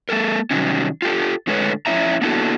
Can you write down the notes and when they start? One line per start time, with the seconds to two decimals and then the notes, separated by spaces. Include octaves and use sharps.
0.09 G#3 A#3 A4 A#4
0.51 C3 D#3 F#3 G3 C#4
1.02 F4 G4 A4
1.47 A2 D3 G#3 A4 B4 C#5
1.86 F2 C#4 E4 E5 A#5
2.21 A#3 B3 D4 E4 F#4 A4